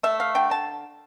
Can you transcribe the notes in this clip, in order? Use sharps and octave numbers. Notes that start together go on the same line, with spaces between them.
A3 E5
F5
D3 G5
A5